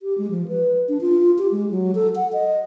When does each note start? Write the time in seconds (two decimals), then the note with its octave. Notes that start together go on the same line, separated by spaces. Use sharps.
0.02 G4
0.18 G#3
0.30 F3
0.48 B4
0.89 D4
1.01 F4
1.38 G4
1.52 G#3
1.71 F#3
1.95 A4
2.16 F#5
2.33 D#5